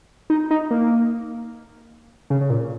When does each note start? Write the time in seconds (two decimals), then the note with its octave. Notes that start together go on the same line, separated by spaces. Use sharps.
0.30 D#4
0.51 D#4
0.71 A#3
2.30 C#3
2.41 C#3
2.50 A#2